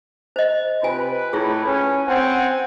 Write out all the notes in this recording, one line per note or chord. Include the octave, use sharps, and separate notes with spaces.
C5 D#5
C3 F4 B4 G#5
A2 E4 F4 G#4
C#4
C4 F#5 G#5